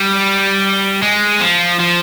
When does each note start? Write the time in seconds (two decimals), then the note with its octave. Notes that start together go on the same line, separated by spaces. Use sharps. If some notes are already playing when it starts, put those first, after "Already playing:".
Already playing: G3
1.02 G#3
1.41 F3
1.80 F3